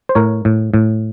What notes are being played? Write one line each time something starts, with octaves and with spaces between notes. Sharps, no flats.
C5
A2 A#4 C#5
A2
A2